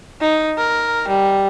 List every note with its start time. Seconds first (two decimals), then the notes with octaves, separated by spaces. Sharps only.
0.21 D#4
0.58 A#4
1.08 G3